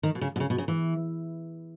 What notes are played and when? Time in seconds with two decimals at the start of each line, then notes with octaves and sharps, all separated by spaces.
0.03 D#3
0.15 B2
0.21 C#3
0.36 B2
0.40 C#3
0.50 B2
0.58 C#3
0.68 E3